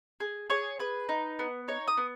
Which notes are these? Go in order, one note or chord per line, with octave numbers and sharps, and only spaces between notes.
G#4
G#4 C#5
G#4 B4
D#4
B3
D#4 C#5
D#6
B3